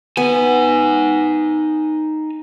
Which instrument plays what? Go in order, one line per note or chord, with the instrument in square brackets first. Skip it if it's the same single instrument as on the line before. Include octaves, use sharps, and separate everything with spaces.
[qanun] B3 [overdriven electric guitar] D#4 G#5